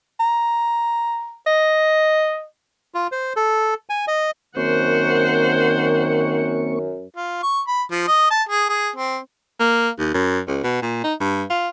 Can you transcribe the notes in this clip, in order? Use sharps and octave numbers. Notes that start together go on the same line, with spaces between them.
A#5
D#5
F4
C5
A4
G#5
D#5
F#2 D#3 A#3 C4 C5 F#5 C#6
F4
C#6
B5
F3
D#5
A5
G#4
G#4
C4
A#3
D#2
F#2
C#2
B2
A#2
D#4
G2
F4